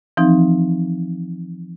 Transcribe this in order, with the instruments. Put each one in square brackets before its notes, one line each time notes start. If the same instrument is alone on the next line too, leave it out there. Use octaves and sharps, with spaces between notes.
[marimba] E3 F3 C4 D#4